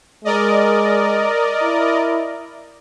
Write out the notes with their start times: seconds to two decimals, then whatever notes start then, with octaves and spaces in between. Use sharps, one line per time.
0.25 G#3 A#4 D5 D#5
1.62 E4